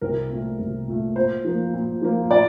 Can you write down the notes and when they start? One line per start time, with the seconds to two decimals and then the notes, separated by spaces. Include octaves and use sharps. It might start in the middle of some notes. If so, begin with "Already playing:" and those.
0.01 C2 A#4
0.29 A#2 A3
0.59 C2
0.88 A#2 A3
1.16 A#2 C5
1.45 F3 A#3
1.74 A#2
2.02 F3 A#3
2.30 A#2 D5